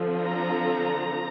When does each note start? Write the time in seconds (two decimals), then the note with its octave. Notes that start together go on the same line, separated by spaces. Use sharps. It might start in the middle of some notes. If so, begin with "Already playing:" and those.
Already playing: D3 F3 C4
0.21 A#5